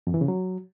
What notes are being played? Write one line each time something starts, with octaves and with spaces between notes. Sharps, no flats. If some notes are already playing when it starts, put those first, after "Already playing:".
F2
E3
C#3
F#3